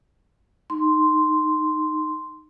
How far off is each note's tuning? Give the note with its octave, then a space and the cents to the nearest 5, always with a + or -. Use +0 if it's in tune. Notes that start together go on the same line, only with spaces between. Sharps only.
D#4 -10 C6 -5